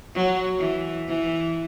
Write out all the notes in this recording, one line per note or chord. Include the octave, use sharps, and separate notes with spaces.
F#3
E3
E3